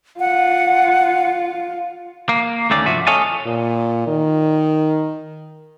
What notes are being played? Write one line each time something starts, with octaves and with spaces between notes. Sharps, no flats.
F4 F#5
A#3
D2 D#3 A3 C#4 D5
C2 G2 F3 F#4 E5
A4 C#5 D#5 F5 G#5 A5
A#2
D#3